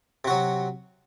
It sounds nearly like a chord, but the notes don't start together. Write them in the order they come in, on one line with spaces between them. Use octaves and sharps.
C3 F#4 F#3